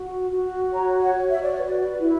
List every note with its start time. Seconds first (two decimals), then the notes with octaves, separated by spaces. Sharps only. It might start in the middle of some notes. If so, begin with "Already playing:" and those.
Already playing: F#4
0.30 F#4
0.72 C#5 A#5
1.01 F#5
1.15 F#4
1.30 E5
1.41 D5
1.52 B4 C#5
1.64 D5
2.00 E4